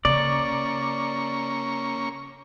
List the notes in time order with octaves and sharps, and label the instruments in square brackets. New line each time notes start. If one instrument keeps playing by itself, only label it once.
[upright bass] C#3 [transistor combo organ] A#3 C#4 C#6 [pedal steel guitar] D5